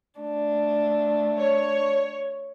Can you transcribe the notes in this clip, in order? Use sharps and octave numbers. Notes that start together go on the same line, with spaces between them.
A3 D4
C#5